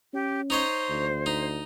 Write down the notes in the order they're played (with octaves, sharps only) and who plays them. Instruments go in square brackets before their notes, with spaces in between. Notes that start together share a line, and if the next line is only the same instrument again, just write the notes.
[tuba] C#4 [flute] G4
[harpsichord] D#4 C#5 D#5 [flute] C5
[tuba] D2
[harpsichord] D#4